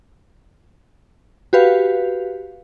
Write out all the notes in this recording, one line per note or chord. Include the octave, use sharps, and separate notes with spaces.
F#4 G4 B4 F5